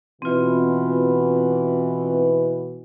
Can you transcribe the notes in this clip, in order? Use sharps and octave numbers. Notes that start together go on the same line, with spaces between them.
B2 E3 C4 F4